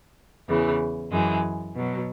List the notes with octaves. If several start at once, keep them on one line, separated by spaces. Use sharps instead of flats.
E2 C#3 E3
F#2 E3 G#3
B2 F#3